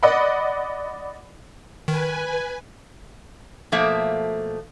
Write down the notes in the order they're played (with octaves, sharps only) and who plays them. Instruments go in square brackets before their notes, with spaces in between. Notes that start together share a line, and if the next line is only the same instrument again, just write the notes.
[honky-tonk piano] D5 D#5 F#5 B5
[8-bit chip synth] D#3 [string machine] B4 G#5
[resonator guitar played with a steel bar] B2 F3 A3 A#3 E5